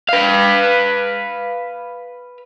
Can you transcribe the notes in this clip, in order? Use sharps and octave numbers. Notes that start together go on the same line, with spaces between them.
B4 F5